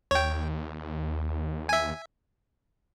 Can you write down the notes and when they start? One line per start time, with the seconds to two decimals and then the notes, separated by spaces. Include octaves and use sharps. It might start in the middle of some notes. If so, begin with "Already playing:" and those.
0.11 D#2 C#5 G5
1.69 E5 G#5